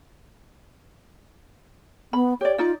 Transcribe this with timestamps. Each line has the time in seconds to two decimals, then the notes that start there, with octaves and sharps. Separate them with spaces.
2.13 B3 B5
2.41 G4 C#5 D5
2.58 D#4 F4 D5